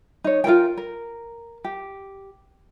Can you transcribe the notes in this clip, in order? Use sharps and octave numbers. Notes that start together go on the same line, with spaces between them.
D#4 C#5
F4 A4 A#4 G5
A#4
G4